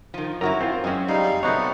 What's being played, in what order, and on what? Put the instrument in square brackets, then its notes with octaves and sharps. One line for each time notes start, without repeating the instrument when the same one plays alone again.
[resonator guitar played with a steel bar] D#3 F3
[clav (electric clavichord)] F#2 A#4 A#5 [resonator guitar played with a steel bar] E4 F#4 C#5
[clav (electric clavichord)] C4 F4 [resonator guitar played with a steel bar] A#4
[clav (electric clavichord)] F#2 C#4 [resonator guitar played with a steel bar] G#3 C4
[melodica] G3 D#4 F5 [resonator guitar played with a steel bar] G#3
[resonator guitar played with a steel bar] B2 F#3 A3 [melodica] B3 D#4 F#5 [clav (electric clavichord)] C4 C#5